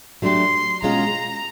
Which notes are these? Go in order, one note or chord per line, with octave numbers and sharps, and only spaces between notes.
F#3 A3 D4 G4 C6
B2 G#3 C#4 F4 A#5